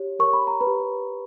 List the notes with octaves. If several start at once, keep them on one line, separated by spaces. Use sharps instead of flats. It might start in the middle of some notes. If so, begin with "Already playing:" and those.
Already playing: G4 C#5
A#4 C#5 C#6
B5
A#5
B4 B5
G4